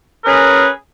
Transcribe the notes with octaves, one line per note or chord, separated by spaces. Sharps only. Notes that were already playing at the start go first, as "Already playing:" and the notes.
C#4 G#4 A#4 B4